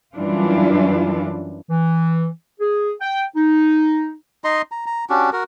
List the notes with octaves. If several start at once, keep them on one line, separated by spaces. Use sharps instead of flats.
F#2 E3 G3 D4 F4
E3
G#4
G5
D#4
D#4 D#5 A#5 C6
A#5
A#5
C#4 D4 F#4 G4
F#4 A#4